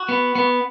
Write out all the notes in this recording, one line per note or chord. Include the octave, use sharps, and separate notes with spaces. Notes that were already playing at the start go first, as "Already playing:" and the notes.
Already playing: F#4
B3
B3